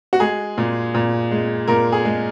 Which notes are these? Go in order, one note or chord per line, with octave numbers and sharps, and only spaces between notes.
F#4
G#3 G#4
A#2
A#2
G#3
A#2 A#4
G#4
G#3